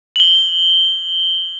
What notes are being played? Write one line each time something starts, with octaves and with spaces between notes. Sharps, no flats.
F#7 G7